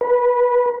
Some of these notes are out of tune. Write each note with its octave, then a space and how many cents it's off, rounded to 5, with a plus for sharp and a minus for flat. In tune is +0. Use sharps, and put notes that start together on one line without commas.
B4 -20